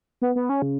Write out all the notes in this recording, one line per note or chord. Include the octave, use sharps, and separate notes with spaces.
B3
B3
C#4
C#3